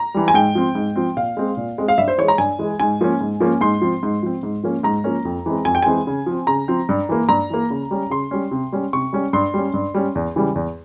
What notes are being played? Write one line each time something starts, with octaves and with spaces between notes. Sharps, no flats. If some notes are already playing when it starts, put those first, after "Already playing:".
Already playing: A#5
E3 G3
G#5
G#2 G5
F3 C4
G#2
F3 C4
A#2 F5
G#3 C4
A#2
G#3 C4
F5
G2 E5
C5
E3 G#3 C#5
A#5
G2 G#5
E3 G#3
G#2 G#5
F3 A#3 C#4
G#2
F3 A#3 C#4
G#2 C6
F3 C4
G#2
F3 C4
G#2
F3 A#3 C#4
G#2 A#5
F3 A#3 C#4
F2
E3 G#3 C4
F2 G#5
G5
E3 G#3 C4 G#5
C#3
F3 C4
C#3 A#5
F3 C4
G2
E3 A#3
G2 A#5
E3 A#3
C#3
G3 C#4
C#3 C6
G3 C#4
C3
G3 C#4
C3 C#6
G3 C#4
G2 C6
G3 C#4
G2
G3 C#4
E2
C#3 E3 G3
E2